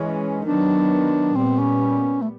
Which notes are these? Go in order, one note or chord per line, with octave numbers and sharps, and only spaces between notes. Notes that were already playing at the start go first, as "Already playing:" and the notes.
Already playing: E3 G#3 C#4
D#3 F#3 B3 D4
A#2 G3 B3 C4
C#4
A3